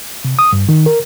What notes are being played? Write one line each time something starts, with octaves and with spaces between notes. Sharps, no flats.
C3
D#6
G2
D#3
A#4